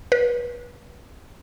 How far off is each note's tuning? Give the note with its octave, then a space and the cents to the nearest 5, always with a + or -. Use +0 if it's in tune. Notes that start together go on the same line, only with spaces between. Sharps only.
B4 -30